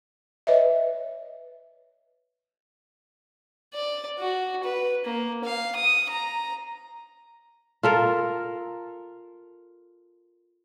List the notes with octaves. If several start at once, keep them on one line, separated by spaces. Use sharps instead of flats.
B4 C#5 D#5 E5
D5
F#4
B4
A#3
F5
D#6
A#5
F4 A4 A#4